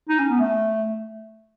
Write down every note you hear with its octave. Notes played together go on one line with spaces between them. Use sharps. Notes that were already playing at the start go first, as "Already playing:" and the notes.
D#4
C#4
B3
A3